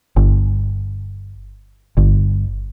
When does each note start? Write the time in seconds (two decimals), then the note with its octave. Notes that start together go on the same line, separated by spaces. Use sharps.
0.16 G1
1.97 G1